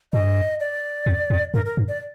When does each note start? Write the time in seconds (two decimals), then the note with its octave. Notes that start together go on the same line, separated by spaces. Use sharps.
0.13 G2 D#5
0.60 D5
1.06 F2
1.30 F2
1.54 G2 A#4
1.66 A#4
1.77 G2
1.88 D5